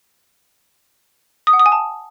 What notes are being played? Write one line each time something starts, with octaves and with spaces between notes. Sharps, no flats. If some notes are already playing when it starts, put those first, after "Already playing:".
D#6
F#5
D#6
G#5
A5